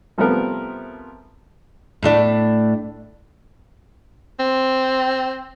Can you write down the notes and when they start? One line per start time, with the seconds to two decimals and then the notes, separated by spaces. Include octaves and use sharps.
0.18 C3 F3 G3 A3 B3 A#4
2.03 A2 A3 D4
4.40 C4